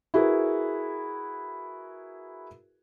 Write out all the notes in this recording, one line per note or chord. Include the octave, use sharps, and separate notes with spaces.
E4 F#4 G#4 A#4 B4